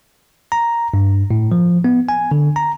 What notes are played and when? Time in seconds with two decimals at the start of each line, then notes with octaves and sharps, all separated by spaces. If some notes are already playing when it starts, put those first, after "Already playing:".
0.52 A#5
0.94 G2
1.31 A2
1.52 F3
1.84 B3
2.09 G#5
2.31 D3
2.56 A#5